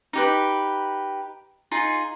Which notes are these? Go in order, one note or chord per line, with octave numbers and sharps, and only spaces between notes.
D#4 G4 B4
D#4 F4 G#4